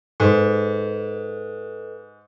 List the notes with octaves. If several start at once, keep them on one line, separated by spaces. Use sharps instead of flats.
G#2 A4 B4 D#5